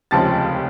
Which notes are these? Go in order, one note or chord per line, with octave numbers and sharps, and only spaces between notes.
F1 D#2 C#3 F3 G#3 A5 A6